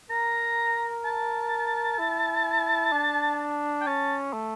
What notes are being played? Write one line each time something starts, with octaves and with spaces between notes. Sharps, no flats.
A#4 A#5
A5
E4
D4
G5
C#4 A5
A3